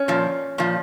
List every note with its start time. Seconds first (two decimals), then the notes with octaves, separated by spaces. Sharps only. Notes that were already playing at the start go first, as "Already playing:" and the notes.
Already playing: C#4
0.08 A#2 F3
0.58 A#2 F3